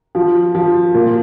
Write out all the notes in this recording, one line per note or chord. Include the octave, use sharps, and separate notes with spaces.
F3
F3
A#2